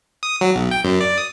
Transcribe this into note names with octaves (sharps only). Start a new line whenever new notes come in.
D#6
F#3
B1
G5
F#2
D5
D#6